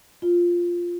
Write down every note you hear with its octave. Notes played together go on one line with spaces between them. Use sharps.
F4